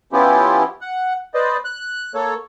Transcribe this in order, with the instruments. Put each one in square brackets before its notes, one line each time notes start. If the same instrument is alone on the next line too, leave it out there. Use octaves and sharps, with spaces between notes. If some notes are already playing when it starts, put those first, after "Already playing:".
[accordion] F3 B3 C#4 E4 F4 G4
F#5
B4 C5 D5 D#5
F#6
A#3 A4 C#5